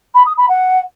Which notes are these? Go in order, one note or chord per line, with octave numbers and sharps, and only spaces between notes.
B5
D#6
B5
F#5